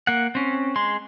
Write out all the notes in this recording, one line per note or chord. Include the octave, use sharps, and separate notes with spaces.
A#3 F#5
C4 C#4
G#3 C6